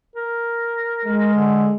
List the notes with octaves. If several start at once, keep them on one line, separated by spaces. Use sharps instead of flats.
A#4
G#3
D3